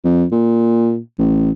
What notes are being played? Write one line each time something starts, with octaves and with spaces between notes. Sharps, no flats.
F2
A#2
A1